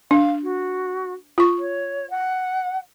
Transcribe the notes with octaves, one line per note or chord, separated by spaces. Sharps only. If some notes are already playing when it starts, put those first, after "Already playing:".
D4 F5
F#4
F4 C#6
C#5
F#5